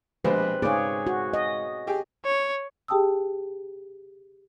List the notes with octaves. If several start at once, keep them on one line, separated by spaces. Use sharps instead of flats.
A#1 B2 G3 G#3 C4 B4
G#2 C#3 G#4 C#5 D5
F#4
D#5
G4 G#4 G5
C#5
G4 G#4 G5 A5 D#6 E6